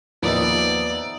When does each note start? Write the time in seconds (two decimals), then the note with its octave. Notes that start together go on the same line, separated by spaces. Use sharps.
0.22 D#2 F3 B3 D#4 F4 D5 E5